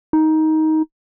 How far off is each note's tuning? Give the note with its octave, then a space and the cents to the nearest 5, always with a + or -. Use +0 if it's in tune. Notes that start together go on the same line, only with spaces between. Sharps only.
D#4 +15